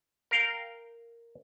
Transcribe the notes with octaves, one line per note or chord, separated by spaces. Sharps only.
A#4 F5 G5